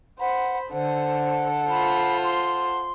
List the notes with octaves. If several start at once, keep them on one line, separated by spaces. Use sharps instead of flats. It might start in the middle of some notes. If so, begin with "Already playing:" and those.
C5 F#5 B5
D3 A4 C5 F#5
F4 C5 B5
C6